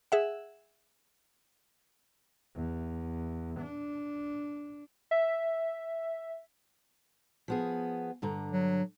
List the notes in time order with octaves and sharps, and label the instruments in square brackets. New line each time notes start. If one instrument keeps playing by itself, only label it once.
[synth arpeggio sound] G#4 E5 F#5
[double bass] E2
D4
[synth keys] E5
[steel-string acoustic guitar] F3 B3 G#4
G2 D3 A#5
[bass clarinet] F#3